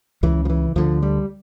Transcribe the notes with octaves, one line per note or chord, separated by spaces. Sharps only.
C#2 C#3 E3
F3
E3
D2 D3 F3
G3